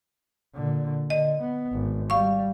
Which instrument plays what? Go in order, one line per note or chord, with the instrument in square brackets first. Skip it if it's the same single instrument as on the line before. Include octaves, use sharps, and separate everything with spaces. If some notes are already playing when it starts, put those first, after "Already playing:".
[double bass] A#2 D3
[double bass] D3 [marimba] D#5
[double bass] B3
G#1
[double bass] G3 [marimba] F5 C#6